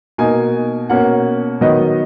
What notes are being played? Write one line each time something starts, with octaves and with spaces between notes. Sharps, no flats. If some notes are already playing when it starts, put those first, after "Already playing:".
B2 A#3 D#4 G#5
B2 A#3 C#4 F#5
D#3 F#3 B3 D#4 D#5